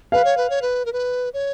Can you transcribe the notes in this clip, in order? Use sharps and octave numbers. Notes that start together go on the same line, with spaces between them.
B4 F5
C#5
B4
C#5
B4
A#4
B4
C#5